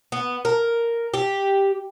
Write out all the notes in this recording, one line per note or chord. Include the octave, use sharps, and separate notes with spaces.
B3
A#4
G4